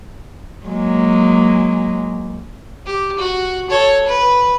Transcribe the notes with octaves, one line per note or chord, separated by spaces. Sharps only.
F#3 G#3 A#3
G4
F#4
A4 C#5
B4